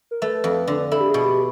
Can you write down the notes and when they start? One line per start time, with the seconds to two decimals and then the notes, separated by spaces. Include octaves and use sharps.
0.11 A#4
0.22 A3 B4
0.44 F2
0.67 D3
0.91 E4 A4
1.00 G4
1.09 G#4
1.14 B2
1.25 G4